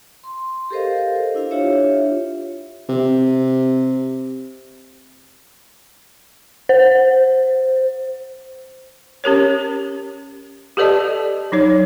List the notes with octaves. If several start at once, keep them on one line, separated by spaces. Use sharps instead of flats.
C6
G4 A4 A#4 C5 D#5 F5
D4 E4 F5
D4 F4 G4 C#5 E5
C3
C5
C#4 G4 A#4 C#5
G4 A4 B4 D5 D#5 A5
F#3 D#4 C#5